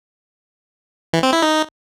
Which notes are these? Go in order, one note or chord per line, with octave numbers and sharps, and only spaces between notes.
E3
C4
E4
D#4